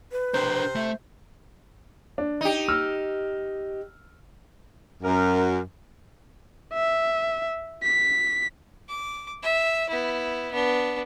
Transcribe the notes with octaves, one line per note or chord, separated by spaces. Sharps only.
B4
C3 D4 A#4 C5
A3 E5
D4
D#4 G4
E6 F6
F#2 A#4
E5
B6
D6
E5
B3 E4
B3 D4